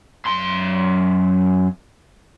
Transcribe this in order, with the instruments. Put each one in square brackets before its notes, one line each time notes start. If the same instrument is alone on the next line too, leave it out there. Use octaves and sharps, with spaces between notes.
[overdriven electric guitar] F#2 C6